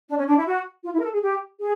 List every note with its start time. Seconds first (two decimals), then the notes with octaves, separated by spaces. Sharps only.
0.08 D4
0.18 C#4
0.28 D4
0.37 E4
0.47 F#4
0.84 F4
0.94 E4
0.99 A#4
1.03 A4
1.13 G#4
1.22 G4
1.59 G#4